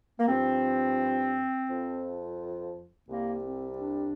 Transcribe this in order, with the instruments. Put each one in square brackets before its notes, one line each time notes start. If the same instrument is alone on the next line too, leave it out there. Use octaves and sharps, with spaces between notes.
[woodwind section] A#3
G2 F3 C4
F2 F3
C2 C3 G3 A#3
C4
D4